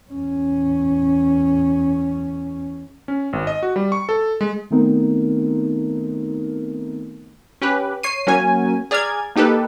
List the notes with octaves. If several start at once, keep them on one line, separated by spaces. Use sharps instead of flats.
E2 C#4
C#4
G#1
D#5
F#4
G3
C#6
A4
G#3
D#3 A3 B3 C4 D#4 A#4
C#4 G4 B4
C#5 C#6 C7 D#7
F#3 A#3 C#4 G#5
G#4 D5 A#5 F6 G#6
A#3 D#4 G4 A4 B4